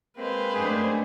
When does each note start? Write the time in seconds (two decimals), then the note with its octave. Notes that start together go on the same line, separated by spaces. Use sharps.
0.18 G#3 A#3 C4 B4 C5
0.54 F#2 A3 D4 G#4